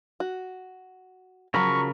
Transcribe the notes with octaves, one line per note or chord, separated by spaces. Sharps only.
F#4
C#3 F3 F#3 A#4 B5 C#6